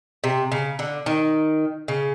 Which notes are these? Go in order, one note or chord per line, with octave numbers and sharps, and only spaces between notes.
C3
C#3
D3
D#3
C#3